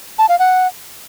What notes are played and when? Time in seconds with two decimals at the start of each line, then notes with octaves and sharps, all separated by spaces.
0.19 A5
0.29 F5
0.39 F#5